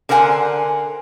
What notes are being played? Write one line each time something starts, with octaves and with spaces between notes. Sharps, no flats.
D3 A#4 C5 F#5 G#5